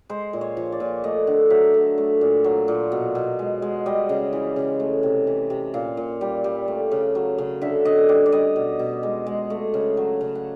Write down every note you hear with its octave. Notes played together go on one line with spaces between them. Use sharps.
G#3 C5
A#2
C#5
F3
D5
A#2
A3 D#5
D3
F#3 E5
D3
A3
A#2
F#3
A#2
B2
B2
G#3
G#3
G3 D#5
C#3
E3
C#3
A3
C3
E3
C3
A#2 F5
A#2
G3
G3
A3
C#3
F#3
C#3
D3 E5
D3 D#5
G3 D5
D5
G3 D#5
B2
B2
G#3
G#3
A3
C#3
F#3
C#3
F#5